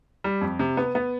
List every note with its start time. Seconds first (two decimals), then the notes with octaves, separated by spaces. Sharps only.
0.24 G3
0.41 F2
0.59 C3
0.77 B3
0.95 B3